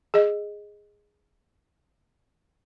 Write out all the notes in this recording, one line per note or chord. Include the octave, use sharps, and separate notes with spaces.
G#4 D#5